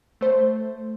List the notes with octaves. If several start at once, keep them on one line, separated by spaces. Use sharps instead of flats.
A3 C5